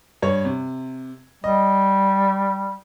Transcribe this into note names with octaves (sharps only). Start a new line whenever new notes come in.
G2 C#5
C3
G3 D#5